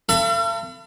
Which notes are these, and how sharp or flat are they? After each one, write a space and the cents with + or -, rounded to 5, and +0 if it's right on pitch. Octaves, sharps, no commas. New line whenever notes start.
A4 +40 F5 -45 B5 +20